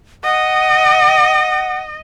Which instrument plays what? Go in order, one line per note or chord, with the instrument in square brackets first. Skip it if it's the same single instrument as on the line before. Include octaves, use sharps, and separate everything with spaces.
[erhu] D#5 [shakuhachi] F#5